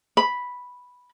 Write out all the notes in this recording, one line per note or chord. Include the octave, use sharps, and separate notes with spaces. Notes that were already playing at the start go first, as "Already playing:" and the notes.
B5